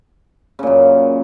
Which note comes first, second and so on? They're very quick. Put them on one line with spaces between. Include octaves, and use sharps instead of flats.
C#3 A#2 F#2